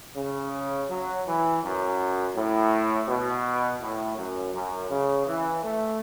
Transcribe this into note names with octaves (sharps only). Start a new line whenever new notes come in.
C#3
F#3
E3
F#2
A2
B2
A2
F#2
F#2
C#3
E3
A3